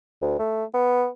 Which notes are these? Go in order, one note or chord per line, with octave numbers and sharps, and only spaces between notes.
D2
A3
B3